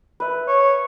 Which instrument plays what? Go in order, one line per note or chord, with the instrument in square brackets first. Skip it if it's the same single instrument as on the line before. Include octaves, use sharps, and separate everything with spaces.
[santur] B4 E5
[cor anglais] C#5